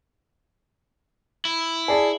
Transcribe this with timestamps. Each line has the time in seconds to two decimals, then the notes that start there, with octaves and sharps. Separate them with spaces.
1.45 E4
1.88 G#4 D5 A5